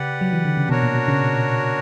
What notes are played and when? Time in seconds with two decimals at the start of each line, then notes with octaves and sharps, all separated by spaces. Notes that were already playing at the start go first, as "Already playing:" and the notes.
Already playing: C#3 G4 B4 D5 F#5
0.21 F#3
0.33 E3
0.45 D3
0.57 C#3
0.69 B2 D4 F#4 A#4 C#5
0.82 A#2
0.95 B2
1.08 C#3